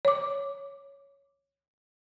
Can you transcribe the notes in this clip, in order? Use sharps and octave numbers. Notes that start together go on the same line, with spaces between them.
C#5 D6